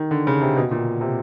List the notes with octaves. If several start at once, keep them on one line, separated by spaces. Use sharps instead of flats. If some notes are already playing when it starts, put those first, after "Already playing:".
Already playing: D#3
D3
C#3
C3
B2
A#2
C3